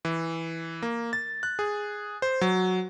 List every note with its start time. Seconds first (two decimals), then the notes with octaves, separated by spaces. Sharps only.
0.05 E3
0.82 A#3
1.13 A6
1.43 F#6
1.59 G#4
2.22 C5
2.41 F#3